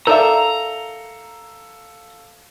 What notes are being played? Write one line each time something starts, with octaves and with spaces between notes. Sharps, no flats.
D#4 A4 A#4 D5 E5 F5 A#5